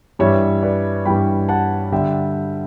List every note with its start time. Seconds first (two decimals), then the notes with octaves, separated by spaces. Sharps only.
0.19 G2 E3 G3 C#5 E5
0.62 B4 D5
1.05 G2 E3 G3 G5 B5
1.49 F#5 A5
1.92 D3 G3 E5 G5